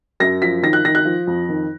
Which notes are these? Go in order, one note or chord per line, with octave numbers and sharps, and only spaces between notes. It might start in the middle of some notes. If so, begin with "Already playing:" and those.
F#2 A#6
F3 B6
D#3 A#6
F#6
D#3 A#6
F#6
F3
F2
D#3